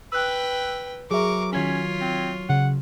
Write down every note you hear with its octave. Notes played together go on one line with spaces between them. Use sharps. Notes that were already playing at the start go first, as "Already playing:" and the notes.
B4 G5 E6 F#6
F#3 G#4 A#4 E5 C#6 D6
D#3 C#4 F4 C#5 G#6 B6
C4
C#3 F#5